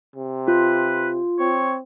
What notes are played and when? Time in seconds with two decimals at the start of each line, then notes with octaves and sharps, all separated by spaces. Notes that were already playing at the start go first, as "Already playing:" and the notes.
0.16 C3
0.48 F4 B4
1.39 C4 C#5